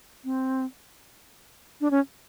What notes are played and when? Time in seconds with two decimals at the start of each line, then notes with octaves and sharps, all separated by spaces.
0.25 C4
1.81 D4
1.91 C#4